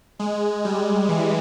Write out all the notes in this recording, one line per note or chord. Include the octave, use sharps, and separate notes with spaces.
G#3
G3
E3